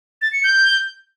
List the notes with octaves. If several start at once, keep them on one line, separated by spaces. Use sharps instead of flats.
A6
C#7
G6